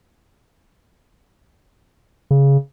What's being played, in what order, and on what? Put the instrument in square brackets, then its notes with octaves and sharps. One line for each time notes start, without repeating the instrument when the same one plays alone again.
[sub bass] C#3